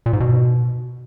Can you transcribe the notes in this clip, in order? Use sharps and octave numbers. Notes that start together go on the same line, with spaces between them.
A#2
G#2
B2